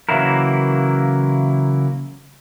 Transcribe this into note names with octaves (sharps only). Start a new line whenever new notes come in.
C#3 E3 F#3 A#3 E4 A#4